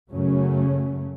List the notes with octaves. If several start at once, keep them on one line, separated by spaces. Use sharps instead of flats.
F#2 C#3 F#3 A3 C#4